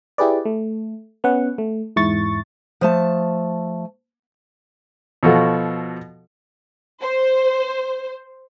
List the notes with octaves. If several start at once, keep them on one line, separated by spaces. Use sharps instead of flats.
E4 G4 G#4 B4 D5
A3
B3 C#4 F#5
A3
E2 G#2 E4 C#6 A6
F3 A3 A5
B2 F3 F#4 A4
C5